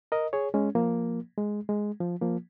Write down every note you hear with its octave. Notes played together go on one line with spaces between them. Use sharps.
A#4 D#5
G#4 C#5
G#3 C#4
F3 A#3
G#3
G#3
F3
F3 A#3